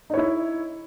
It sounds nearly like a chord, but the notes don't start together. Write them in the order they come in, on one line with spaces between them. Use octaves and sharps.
D#4 C#5 E4